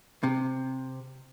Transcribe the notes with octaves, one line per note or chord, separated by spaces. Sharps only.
C3